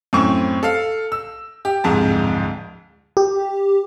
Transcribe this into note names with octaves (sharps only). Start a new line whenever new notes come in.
F#2 A2 C4 C#6
A4 F5
E6
G4
D1 F2 G#2 A5
G4